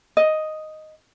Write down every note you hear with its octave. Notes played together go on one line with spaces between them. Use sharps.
D#5